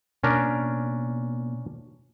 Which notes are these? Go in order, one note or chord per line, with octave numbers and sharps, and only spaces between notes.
B2 A#3 C#4 D4 A#4